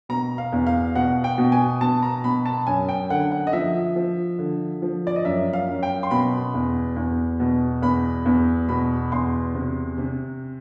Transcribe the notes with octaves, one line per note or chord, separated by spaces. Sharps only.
B2 A#5
F5
E2
F5
B2 F#5
G5
B2
G#5
B2 A5
A#5
B2 B5
A5
F#2 G#5
G5
D3 F#5
F#5
D#5
F3 E5
F3
D3
F3
D5
D#5
F#2 E5
F5
F#2
G5
C6
B2 B5
E2
E2
B2
E2 B5
E2
B2 B5
E2 C6
C3
C3